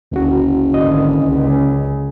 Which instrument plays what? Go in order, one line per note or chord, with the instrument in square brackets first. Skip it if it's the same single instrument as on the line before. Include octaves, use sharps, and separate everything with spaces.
[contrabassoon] F#1 [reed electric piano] D2 F#4
[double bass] G#1 D3 [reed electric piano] D#5
[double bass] C#2